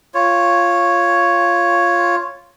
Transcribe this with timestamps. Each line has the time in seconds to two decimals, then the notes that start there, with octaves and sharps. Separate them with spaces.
0.14 F4 C#5